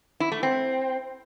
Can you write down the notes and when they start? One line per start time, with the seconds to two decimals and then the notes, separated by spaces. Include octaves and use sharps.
0.20 E4
0.32 A3
0.43 C4